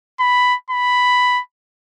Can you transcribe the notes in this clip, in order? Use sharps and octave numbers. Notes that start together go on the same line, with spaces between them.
B5
B5